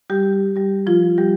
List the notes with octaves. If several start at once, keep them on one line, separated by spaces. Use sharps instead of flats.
G3 G4
G3 G4
F3 F4
G3 G4